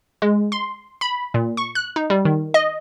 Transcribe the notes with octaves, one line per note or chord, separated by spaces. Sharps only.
G#3
C6
B5
A#2
C#6
F#6
D#4
G3
D#3
D#5